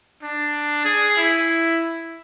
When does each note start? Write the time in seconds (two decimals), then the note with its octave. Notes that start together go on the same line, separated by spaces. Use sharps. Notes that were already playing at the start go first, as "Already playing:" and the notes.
0.23 D4
0.85 G#4
1.17 E4